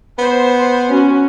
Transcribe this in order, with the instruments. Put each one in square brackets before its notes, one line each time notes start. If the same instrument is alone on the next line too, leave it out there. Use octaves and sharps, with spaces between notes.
[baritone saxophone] B3 [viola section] C5
[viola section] C5
C#4 F#4